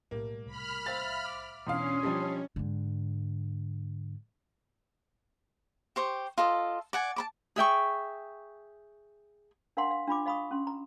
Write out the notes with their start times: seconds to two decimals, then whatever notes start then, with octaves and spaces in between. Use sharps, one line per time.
0.11 B1 A2 G3 A#3
0.46 C2 B5 F6
0.86 C5 E5 F5 A6
1.25 D6
1.67 E2 B2 C#4 D4 F4 F5 C6 D#6
2.03 F3 G3 D#5 A5
2.56 G#2 D3
5.96 G4 C5 C#6
6.38 F4 A4 D#5
6.93 D5 F#5 G#5
7.16 A5 B5 D6
7.56 G#4 E5 G5 C#6
9.77 D4 A#4 F5 F#5 A#5 C6
9.91 F5
10.08 D4 F4 B5 D6
10.26 D#5 F5 B5 C#6 D#6
10.51 C#4 C6
10.67 A#5